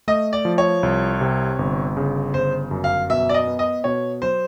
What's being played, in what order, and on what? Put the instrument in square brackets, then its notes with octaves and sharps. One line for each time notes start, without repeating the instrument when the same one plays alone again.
[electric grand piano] A3 [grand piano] D#5
[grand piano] D5
[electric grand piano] F3
[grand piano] C#5
[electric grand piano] C2
C3
G1
C#3
[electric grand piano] G1 [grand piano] C5
[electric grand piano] F#2
[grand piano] F5
[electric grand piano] B2 [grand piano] E5
[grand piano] D5
D#5
[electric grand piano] B3
[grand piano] D#5
[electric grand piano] B2 [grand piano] C#5
[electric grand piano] F#3 [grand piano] C5